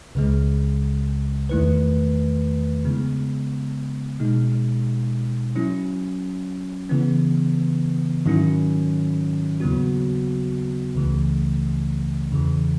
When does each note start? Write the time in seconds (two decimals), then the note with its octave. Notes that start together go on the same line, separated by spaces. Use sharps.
0.15 C#2 C#3 G#3
1.49 E2 D#3 A3 E4 B4
2.85 C#3 G#3 B3
4.20 B2 G#3 D#4
5.56 F#3 C#4 E4
6.89 C#3 E3 B3
8.26 G#2 D#3 F#3 C#4 E4
9.60 D#2 C#3 F#3 B3 F#4
10.95 C#2 C#3 E3 A3
12.31 E2 C#3 E3